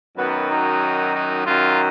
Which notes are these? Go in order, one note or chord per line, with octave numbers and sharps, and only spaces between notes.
F#2 D#3 F#3 B3
D#4
D#4
F#2 D#3 F#3 F4